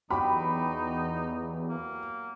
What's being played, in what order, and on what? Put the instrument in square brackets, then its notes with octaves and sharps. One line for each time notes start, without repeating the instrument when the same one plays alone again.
[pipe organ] E2 [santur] F#3 G4 G5 [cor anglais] D#4 [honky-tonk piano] B5
[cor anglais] A#3